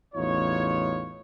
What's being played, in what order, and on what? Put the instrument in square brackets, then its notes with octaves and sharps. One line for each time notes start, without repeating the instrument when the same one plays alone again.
[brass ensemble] A1 E2 D#4 F4 C#5